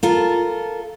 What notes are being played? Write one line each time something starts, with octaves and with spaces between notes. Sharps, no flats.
F4 A4 A#4